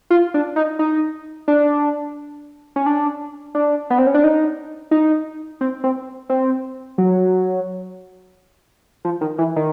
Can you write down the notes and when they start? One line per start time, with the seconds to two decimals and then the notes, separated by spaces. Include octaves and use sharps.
0.10 F4
0.34 D4
0.56 D#4
0.79 D#4
1.48 D4
2.76 C#4
2.86 D4
3.55 D4
3.90 B3
3.98 C4
4.07 C#4
4.15 D4
4.24 D#4
4.91 D#4
5.61 C4
5.84 C4
6.30 C4
6.98 F#3
9.05 F3
9.21 D#3
9.38 E3
9.56 D#3